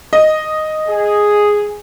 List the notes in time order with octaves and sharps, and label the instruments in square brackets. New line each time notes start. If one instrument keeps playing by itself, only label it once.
[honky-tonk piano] D#5
[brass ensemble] G#4